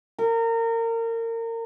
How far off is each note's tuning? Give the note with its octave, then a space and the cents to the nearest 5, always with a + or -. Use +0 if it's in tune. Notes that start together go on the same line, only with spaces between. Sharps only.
A#4 -30